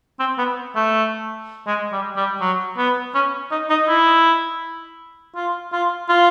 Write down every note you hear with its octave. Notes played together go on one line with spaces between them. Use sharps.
C4
B3
A3
G#3
G3
G3
F#3
B3
C#4
D#4
D#4
E4
F4
F4
F4